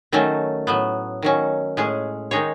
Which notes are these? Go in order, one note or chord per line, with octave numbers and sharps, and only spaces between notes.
D#3 F#3 A3 C#4
A2 F#3 B3
D#3 F#3 C#4
A2 G#3 C#4 G#4
D#3 G#3 D#4 G#4 C#5